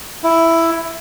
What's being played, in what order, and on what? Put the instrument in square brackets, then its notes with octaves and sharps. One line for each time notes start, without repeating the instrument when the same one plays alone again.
[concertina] E4